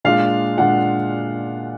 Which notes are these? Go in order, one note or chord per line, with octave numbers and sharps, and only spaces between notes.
A#2 G#3 D4 F4 F5
A#2 G#3 D4 F4 F#5